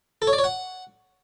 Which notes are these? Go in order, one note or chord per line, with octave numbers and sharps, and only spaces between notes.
A4
C#5
D5
C#5
F#5